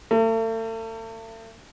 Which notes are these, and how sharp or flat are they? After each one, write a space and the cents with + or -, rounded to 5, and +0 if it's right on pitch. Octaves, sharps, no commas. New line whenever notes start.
A3 +40